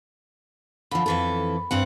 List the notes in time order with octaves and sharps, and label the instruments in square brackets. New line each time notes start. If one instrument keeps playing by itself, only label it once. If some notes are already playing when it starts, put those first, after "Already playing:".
[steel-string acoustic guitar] D3 F3 [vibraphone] B5
[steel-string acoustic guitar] F2 E3 A4
G2 C4 F#5